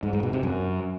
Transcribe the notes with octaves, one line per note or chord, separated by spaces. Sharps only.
G#2
G#2
B2
C3
F#2